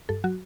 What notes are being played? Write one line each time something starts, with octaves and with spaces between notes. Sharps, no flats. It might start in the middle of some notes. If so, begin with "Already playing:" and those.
G2 A4
F#3 F#4